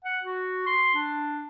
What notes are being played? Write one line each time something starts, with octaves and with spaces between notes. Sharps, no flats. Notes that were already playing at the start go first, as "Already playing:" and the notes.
F#5
F#4
C6
D4